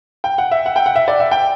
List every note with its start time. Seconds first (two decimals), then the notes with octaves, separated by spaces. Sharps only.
0.24 G5
0.38 F#5
0.51 E5
0.66 F#5
0.76 G5
0.86 F#5
0.96 E5
1.08 D5
1.20 E5
1.31 G5